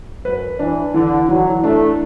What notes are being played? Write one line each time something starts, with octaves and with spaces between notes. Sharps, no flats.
F#2 B4
E3 D4
D3 E3
E3 F#3
A3 D4